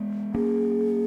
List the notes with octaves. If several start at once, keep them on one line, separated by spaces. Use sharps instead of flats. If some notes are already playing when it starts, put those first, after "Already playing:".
Already playing: G#3 B3
A#3 C#4 G#4